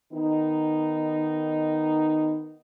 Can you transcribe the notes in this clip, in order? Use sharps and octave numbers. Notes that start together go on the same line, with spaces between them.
D#3 B3 D#4